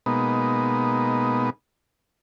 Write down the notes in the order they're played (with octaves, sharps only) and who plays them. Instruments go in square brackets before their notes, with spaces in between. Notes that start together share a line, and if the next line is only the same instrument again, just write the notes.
[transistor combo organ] B2 G#3 A#3 B3 D#4